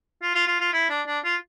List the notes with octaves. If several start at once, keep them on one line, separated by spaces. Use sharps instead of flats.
F4
F4
F4
F4
E4
D4
D4
F4